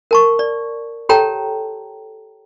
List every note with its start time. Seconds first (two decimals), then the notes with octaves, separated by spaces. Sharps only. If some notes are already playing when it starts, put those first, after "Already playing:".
0.11 A#4 A5 C#6
0.39 D5
1.09 G4 A4 C#5 G5 A5 A#5